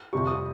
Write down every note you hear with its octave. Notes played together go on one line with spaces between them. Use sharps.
F2 C3 G3 C#6
D#6